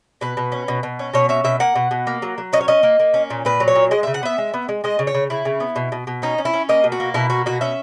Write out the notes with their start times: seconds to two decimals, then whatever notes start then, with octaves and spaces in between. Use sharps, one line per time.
0.21 B2 B4
0.37 B2
0.52 C#4
0.68 B2
0.83 B2
0.99 C#4
1.14 B2 C#5
1.29 C#4 E5
1.44 B2 E5
1.60 A#3 F#5
1.75 B2
1.91 B2
2.07 A#3
2.22 F#3
2.38 F#3
2.53 C#4 D#5
2.61 C#5
2.68 C#4 D#5
2.83 A#3
3.00 A#3
3.14 C#4
3.30 A#2
3.45 A#2 B4
3.60 F#3
3.68 C#5
3.75 A#2
3.91 G#3 D#5
4.03 E5
4.07 C#3
4.14 F#5
4.23 B3 E5
4.38 G#3
4.54 B3
4.69 G#3
4.84 G#3 D#5
4.99 C#3
5.07 C#5
5.14 C#3
5.30 C#3 E4
5.45 C#3
5.60 B3
5.76 B2
5.92 B2
6.07 B2
6.22 C#4 D#4
6.38 C#4
6.45 E4
6.54 C#4
6.69 A#3 D#5
6.84 B2
6.92 F#4
7.00 A#3
7.14 B2 E4
7.30 A#3 F#4
7.46 B2 F#4
7.61 C#4 E5